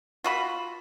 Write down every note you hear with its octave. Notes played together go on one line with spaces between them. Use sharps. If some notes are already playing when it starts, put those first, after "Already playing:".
F4 F#4 B5